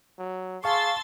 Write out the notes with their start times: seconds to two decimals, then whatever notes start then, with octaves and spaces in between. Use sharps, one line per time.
0.19 F#3
0.64 G#4 F5 A5 C6 C#6 E6 A6